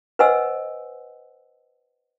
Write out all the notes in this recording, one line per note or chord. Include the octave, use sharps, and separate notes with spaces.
B4 C5 D#5 F#5 G#5 E6